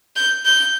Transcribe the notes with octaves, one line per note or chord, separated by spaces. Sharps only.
G6
G6